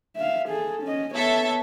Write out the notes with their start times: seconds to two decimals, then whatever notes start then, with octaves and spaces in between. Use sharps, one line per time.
0.16 E5 F5
0.49 G#4 A4
0.83 C#4 D#5
1.15 B3 A4 C#5 E5